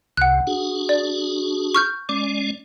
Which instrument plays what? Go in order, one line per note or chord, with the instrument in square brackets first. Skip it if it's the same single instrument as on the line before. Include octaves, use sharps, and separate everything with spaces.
[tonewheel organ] C2 C3 [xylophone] F#5 F#6
[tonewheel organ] D4 F#4 G#4
[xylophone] D5
C#6 F6 G6
[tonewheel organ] G#3 C#4 D5 [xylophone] D6